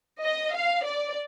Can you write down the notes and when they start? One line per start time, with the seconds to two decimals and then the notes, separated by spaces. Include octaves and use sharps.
0.23 D#5
0.55 F5
0.86 D5